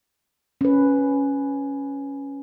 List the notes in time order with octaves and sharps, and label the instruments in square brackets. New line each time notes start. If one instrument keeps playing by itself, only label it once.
[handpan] C#4 B4